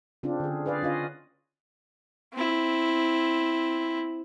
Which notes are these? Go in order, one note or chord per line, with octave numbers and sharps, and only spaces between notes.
C#3 C4 D4 F4
D3 G#4
G#4 B4 D5 F5
C#4 F4 D#5 F5
C4 E4